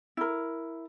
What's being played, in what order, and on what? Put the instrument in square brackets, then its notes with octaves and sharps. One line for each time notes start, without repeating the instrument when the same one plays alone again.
[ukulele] E4 A#4